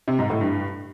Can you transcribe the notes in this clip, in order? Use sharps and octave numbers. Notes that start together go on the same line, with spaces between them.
C3
G#2
A2
G2